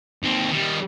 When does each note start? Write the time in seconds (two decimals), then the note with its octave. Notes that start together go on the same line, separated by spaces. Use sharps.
0.23 D#2 C4
0.50 D#3 G3